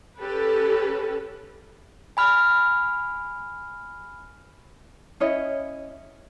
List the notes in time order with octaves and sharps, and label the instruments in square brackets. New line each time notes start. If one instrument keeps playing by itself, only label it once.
[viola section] C#4 G4 A4 B4
[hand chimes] G#5 B5 F6
[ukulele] C#4 E4 C#5 D#5